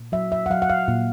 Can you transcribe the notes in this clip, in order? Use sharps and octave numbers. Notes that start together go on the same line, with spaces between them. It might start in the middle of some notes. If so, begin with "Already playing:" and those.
Already playing: A#2
F#3 E5
E5
F#5
F#3 F5
F#5
F5
A#2